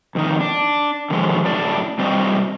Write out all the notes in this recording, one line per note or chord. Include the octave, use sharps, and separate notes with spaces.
F2 D#3 D#4
D4
D3 D#3 F3 F#3 G#3
F#2 A2 D4 D5
G3 C4 F#4 C5 D5 D#5